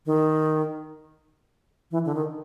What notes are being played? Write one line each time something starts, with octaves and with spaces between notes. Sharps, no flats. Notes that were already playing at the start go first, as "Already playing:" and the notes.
D#3
E3
D3
D#3